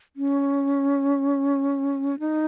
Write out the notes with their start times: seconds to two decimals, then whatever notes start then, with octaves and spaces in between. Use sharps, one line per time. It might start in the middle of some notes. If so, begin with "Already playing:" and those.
0.16 C#4
2.19 D#4